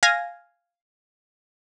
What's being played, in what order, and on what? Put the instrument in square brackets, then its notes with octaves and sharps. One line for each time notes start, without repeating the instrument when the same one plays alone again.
[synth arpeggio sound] F5 G#5 A#6